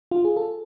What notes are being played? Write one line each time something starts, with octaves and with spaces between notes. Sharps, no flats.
F4
G#4
A4